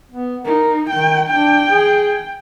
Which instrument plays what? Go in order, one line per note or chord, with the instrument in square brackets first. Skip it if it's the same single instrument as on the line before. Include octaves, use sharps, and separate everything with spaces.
[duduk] B3
[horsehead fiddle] D#4 [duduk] A#4
[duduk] D#3 [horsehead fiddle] G5
[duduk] D4 [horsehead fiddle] G5
[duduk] G#4